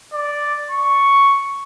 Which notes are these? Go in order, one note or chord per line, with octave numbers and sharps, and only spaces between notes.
D5
C#6